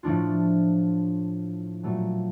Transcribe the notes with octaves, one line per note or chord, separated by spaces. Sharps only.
A2 F3 A3 D4 F4
A#2 F#3 A3